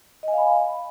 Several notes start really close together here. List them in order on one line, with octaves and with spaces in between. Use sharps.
D#5 G#5 F5 B5